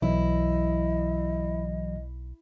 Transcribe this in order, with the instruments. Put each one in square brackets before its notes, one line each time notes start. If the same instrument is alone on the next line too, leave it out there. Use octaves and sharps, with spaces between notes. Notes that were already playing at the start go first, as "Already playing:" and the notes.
[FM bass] B1 [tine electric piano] E3 F#3 [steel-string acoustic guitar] E4 [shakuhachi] D#5